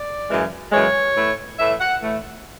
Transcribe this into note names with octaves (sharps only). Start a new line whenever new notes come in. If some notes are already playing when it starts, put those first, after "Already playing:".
Already playing: D5
F#2 C#3 E3 G#3
F#2 C#3 E3 G#3 C#5
A2 E3 A3
A2 E3 A3 E5
F#5
A2 E3 A3